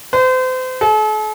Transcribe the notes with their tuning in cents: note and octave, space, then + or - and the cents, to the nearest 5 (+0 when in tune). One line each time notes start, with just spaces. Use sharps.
C5 -35
A4 -45